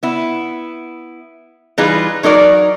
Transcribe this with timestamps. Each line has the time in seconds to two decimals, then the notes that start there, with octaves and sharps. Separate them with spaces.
0.03 B3 E4
1.78 E3 G3 D#4 F4 G#4 B4
2.23 F#3 D#4 A#4 D5